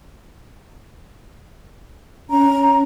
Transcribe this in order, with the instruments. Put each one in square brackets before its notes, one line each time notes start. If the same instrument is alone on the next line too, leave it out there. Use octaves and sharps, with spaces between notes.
[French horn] C#4 [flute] A#5